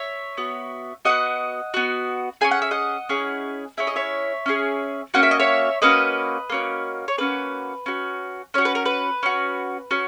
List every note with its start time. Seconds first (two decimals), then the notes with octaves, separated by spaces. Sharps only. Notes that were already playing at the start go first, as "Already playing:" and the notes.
Already playing: C#5 E5
0.37 B3 F#4
1.05 B3 F#4 D#5 F#5
1.74 B3 F#4
2.41 C#4 E4 G#4 G#5
2.51 F#5
2.62 E5
2.71 D#5 F#5
3.09 C#4 E4 G#4
3.77 C#4 E4 G#4 E5
3.87 D#5
3.96 C#5 E5
4.46 C#4 E4 G#4
5.14 A#3 C#4 F#4 F#5
5.23 E5
5.31 D#5
5.39 C#5 E5
5.82 A#3 C#4 F#4 B4 D#5
6.50 A#3 C#4 F#4
7.08 C#5
7.18 A#3 C#4 F#4 B4
7.86 C#4 F#4
8.54 C#4 F#4 C#5
8.65 B4
8.75 A#4
8.86 B4
9.23 C#4 F#4
9.91 C#4 F#4